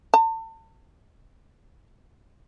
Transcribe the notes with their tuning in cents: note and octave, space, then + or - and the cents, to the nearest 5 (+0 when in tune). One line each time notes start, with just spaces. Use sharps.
A5 +35